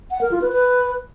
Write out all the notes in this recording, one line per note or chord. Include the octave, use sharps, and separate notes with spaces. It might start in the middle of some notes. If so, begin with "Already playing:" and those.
F#5
A#4
F4
B4
B4